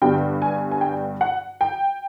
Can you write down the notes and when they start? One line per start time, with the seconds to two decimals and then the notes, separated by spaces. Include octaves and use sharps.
0.02 G2 D3 G3 B3 G5
0.42 G#5
0.71 G#5
0.81 G5
1.21 F#5
1.61 G5